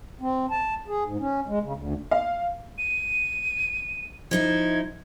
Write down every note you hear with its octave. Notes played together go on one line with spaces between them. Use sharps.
C4
A5
G#4
G#2
C#4
G#3
C#3
D2
F5
D#7
F3 D#4 E4 G#6